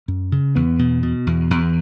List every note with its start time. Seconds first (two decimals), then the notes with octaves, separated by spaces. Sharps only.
0.08 F#2
0.32 C#3
0.55 E2 B3
0.79 B2
1.03 B2
1.27 E2
1.51 E2